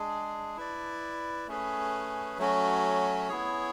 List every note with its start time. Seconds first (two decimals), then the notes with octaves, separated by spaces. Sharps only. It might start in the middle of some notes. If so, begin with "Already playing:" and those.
Already playing: G#3 D4 G#4
0.57 E4 B4 D5
1.47 A3 C#4 G#4 B4
2.38 F#3 A3 C#4 F#4
3.28 B3 E4 G#4 C#5